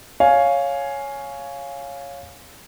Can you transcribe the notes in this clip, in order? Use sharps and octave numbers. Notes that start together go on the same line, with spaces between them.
C#5 F5 G#5